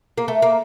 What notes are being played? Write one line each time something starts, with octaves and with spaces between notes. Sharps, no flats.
A#3
A3
A#3